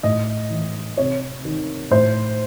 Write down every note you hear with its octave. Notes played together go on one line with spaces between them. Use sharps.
A2 D#5
E3
C3 C#5
D#3
A2 C5